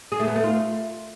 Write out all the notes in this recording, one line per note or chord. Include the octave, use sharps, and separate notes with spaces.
G#4
A3
B3
A3
F4